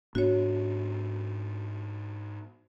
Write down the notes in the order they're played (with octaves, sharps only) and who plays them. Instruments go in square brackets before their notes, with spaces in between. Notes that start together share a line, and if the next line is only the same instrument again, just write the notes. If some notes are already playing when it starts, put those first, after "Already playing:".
[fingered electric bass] G#2 B3 D4 [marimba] F#4 C#5